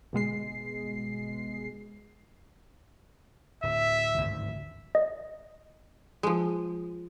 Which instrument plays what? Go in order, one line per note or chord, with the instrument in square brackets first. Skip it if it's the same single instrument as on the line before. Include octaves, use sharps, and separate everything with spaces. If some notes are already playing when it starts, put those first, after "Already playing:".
[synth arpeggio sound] G1 B2 G#3 C7
[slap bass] D1 [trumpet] E5
[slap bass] G#1 D2 G2
[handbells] D#5
[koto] F3 G#3